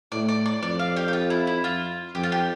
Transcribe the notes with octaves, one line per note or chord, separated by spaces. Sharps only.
A2 D5
D5
D5
F2 D5
F5
G4
G4
F4
E4
E4
F4
F2 G4
F4
G4